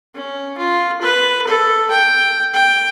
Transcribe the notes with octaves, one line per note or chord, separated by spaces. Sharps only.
C#4
F4
B4
A4
G5
G5